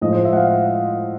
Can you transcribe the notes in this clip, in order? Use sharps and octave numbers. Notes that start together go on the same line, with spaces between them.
A2 F3 G#3 D#5
C5
E5
F#5
F5